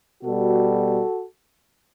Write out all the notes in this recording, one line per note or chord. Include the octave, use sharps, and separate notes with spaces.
B2 G3 F#4 A4